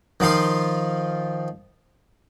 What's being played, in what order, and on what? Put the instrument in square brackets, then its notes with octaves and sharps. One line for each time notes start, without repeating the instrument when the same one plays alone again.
[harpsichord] D#3 F3 F4 C6